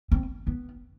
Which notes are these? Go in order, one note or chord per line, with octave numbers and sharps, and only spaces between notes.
C4
B3